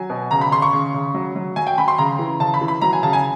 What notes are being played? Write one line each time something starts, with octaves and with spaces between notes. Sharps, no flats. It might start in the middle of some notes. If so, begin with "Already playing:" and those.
Already playing: F#3 G#5
B2
C#3 A#5
B5
C#3 C6
C#6
C#3
C#3
F#3
F#3
F#3 G#5
G5
F#3 B5
C6
C#3 A#5
E3
C#3 A5
B5
E3
B5
F#3 A#5
G#5
C#3 A5
G#5